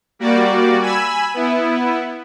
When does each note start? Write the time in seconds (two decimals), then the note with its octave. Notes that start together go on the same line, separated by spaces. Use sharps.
0.19 G3 A#3 F#4 D5
0.81 G#5 B5 E6
1.34 B3 E4